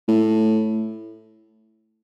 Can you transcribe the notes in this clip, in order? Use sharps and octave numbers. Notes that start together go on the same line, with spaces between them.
A2